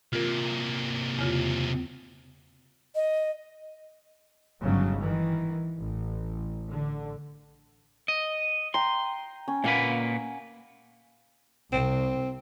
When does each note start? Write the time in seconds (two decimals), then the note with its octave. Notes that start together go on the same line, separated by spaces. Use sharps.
0.13 C3 A#3 F4 A#4
1.19 E2 C#3 F4
2.95 D#5
4.62 G1 G#2 C#3 F#3
5.01 D#3 E3
5.79 A1
6.69 D3
8.08 D#5
8.74 G5 A#5 C6
9.48 C#4
9.64 A#2 A#3 B4 F5 F#5
11.72 C2 C4